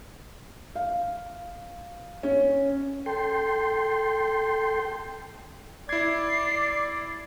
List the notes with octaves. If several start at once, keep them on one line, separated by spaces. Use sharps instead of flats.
F5
C#4
A4 G5 C6
E4 D5 G#6 C7